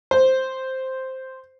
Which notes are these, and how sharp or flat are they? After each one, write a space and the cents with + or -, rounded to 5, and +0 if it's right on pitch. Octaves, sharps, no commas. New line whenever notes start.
C5 +0